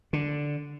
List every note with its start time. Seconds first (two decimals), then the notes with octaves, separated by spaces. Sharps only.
0.13 D3